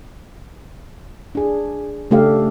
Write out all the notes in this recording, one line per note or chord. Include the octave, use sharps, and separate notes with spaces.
D4 G#4
C#3 A3 D4 G4 A4 F5